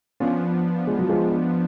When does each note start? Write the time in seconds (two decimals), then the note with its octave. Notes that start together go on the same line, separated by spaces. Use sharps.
0.20 F3 B3 C#4 D4 F4
0.87 F3 G#3
0.99 F#3
1.09 F3 G#3